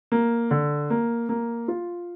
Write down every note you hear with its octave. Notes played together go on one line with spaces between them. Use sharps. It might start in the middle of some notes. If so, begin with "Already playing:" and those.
A#3
D3
A#3
A#3
F4